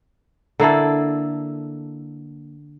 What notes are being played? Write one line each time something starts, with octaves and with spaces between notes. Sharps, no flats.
D3 A#3 E4 A4